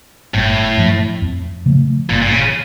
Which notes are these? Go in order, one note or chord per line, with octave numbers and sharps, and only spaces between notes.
G1 A2
G2 F3
F2
C#3 F3 A3
G1 A#2
A#2
C#3